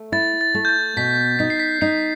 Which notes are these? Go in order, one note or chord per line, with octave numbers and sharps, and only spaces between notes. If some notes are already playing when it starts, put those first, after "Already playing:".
Already playing: A3
E4 A6
A6
A3
G6
A6
B2 B6
D#4 B6
C7
B6
D#4 C7